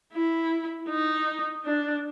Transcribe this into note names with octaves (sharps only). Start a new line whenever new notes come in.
E4
D#4
D4